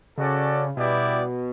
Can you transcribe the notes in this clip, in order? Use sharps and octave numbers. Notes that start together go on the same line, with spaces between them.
C#3 C#4 F#4 A4 D5
B2 G3 B3 E4 G4 D5